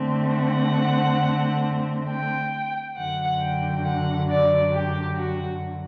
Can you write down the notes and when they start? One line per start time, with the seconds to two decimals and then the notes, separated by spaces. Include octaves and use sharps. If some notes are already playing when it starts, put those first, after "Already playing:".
Already playing: D3 A3 C4
0.35 F#5
2.10 G5
2.98 F#2 D3 F#3 F#5
3.42 G5
3.85 F#5
4.29 D5
4.73 G4
5.16 F#4